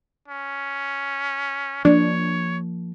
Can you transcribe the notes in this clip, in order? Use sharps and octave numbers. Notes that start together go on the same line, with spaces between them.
C#4
F3 A#3 D4 C#5